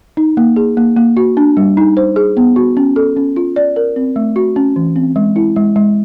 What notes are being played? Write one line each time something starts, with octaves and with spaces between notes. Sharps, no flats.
D#4
A#3
G#4
A#3
A#3
F#4
D4
G3
D#4
C5
G#4
B3
F#4
C#4
A4
C#4
F4
D5
A#4
C4
A3
F#4
C#4
E3
C4
G#3
E4
G#3
G#3